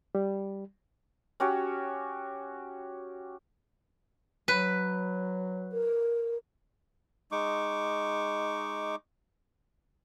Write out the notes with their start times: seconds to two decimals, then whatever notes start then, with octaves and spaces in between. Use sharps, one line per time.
0.15 G3
1.40 C#4 F#4 G4 C#5
4.48 F#3 B4
5.72 A#4
7.32 G#3 D#4 C#6 D6